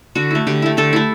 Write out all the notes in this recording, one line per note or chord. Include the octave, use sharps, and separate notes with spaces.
D3 F#4
A3 E4
D3 G4
A3 E4
D3 A4
A3 E4